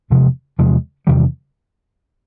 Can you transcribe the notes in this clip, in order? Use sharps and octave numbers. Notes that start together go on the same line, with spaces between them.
E2 C3 F3 G#3
E2 C3 F3 G#3
E2 C3 D#3 G3